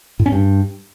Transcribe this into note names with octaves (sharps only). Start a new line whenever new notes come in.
A2
C#4
G2